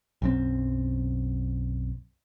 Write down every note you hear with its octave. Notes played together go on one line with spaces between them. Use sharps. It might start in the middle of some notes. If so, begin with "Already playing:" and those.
B1 F#2 C4